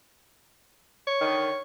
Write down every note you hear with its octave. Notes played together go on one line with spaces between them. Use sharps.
C#5
D3 D#3